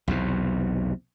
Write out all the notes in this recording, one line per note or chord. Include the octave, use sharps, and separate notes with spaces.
B1 E2 C3